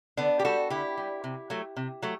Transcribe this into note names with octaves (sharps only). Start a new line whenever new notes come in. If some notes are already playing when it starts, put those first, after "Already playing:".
D3 B3 D4
G4
G3 F#4 A4
D3 E4 G4
G3
C3
F#3 A3
C3
F#3 A3